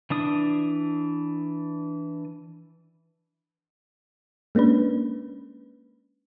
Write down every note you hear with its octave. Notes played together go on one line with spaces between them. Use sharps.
E3 D4 D#6
G#3 A#3 C#4 D4 B4